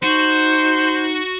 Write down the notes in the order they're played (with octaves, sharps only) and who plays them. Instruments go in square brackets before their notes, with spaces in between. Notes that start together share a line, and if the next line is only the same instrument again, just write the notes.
[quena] D#4 [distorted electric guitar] F#4 [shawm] C5